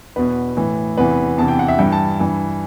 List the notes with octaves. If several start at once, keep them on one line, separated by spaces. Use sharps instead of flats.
E2 B2 B4
A2 E3
E2 C3 E3 B4
E2 C3 E3 A5
G5
F#5
E5
G2 E3 G5
A5
G2 E3